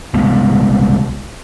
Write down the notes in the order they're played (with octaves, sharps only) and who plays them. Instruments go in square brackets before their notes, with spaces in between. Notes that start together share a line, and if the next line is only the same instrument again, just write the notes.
[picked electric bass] C2 G#3 B3